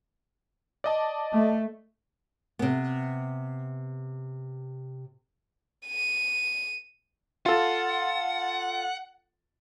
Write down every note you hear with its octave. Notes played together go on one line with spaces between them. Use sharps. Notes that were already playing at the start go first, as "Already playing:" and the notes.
D5 D#5 A5
A3
C3 B3
D#7
F4 A4 F#5